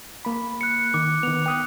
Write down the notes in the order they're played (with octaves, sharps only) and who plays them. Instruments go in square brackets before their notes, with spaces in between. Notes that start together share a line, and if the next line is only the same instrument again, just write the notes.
[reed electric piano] A#3 B5
[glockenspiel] F#6 C#7
[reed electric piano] D#3 [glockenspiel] D6
[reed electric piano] D#3 B3 [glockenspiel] F7
[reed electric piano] G5 D#6 F#6